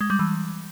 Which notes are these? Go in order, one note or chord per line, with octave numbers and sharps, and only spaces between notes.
G#3
G3
E3